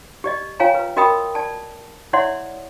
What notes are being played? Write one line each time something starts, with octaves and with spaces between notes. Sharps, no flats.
G4 D5 D#5
F4 C#5 F5 G5 G#5 A#5
B4
F#4 A#4 D#5 G5 B5 D#6
D5 A5
E4 C#5 D5 E5 F#5 C6